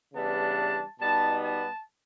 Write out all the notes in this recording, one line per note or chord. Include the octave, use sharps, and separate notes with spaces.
C#3 E3 G3 B3 D4 A5
B2 G3 B3 D#4 A5
A5